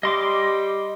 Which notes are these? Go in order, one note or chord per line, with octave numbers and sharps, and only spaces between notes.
G3 D#5 C6 D6